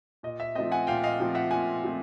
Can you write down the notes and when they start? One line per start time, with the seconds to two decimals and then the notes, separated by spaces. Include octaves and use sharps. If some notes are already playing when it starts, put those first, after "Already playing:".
0.23 A#2 D#5
0.40 E5
0.55 F3 A3 C4 D#5
0.72 F#5 G#5
0.87 A#2 F5 G5
1.04 D#5 F5
1.20 F3 A3 C4
1.35 E5 F#5
1.51 A#2 F#5 G#5
1.83 F3 A3 C4